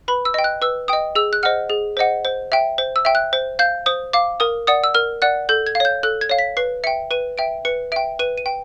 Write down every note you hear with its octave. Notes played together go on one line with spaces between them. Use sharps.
B4 B5
E6
D#5 G5
F#6
B4 E6
D#5 G5 D#6
G#4 E6
F#6
C5 D#5 F#5 F6
G#4
C5 D#5 F#5
C5
E5 G5
C5
E6
E5 G5
F#6
C5
F5 G6
C5 D#6
F5 D6
A#4 D#6
D5 F#5 D#6
E6
A#4 F6
D5 F#5 F#6
A4 G6
G#6
F5
C#5 G6
A4 F#6
G#6
C#5 F5
B6
B4 C7
E5 G5 C#7
B4 D#7
E5 G5 D7
B4 C#7
E5 G5 D7
B4 D#7
D#7
G5